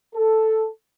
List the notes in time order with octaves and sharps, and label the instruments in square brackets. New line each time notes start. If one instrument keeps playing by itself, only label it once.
[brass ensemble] A4